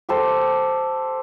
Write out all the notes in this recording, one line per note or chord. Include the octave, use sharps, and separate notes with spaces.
G4 A4 C5